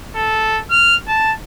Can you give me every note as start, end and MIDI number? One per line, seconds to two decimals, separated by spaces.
0.15 0.60 69
0.71 0.95 89
1.07 1.32 81